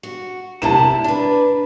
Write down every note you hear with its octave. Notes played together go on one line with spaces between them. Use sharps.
F#4
C3 E4 A#4 A5 E7
D4 B4